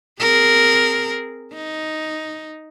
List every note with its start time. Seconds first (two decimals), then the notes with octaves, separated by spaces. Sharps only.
0.20 C4 G#4 A#4
1.53 D#4